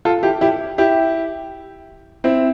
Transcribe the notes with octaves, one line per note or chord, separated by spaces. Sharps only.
F4 A4
E4 G4
E4 G4
E4 G4
C4 E4